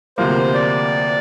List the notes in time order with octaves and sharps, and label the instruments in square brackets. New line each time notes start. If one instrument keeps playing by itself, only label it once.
[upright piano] D2 C3 F3 A#3 [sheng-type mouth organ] C5
[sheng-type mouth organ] D5